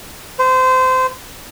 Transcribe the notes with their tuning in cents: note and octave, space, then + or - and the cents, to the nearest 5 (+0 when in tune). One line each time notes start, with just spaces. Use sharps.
C5 -25